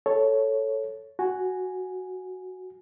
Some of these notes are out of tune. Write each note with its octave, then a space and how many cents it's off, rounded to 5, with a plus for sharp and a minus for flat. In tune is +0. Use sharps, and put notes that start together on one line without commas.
A4 +0 C#5 +0
F#4 +0 G#5 +0